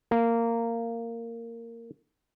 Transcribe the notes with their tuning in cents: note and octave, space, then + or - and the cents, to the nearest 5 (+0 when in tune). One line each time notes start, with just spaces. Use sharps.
A#3 -15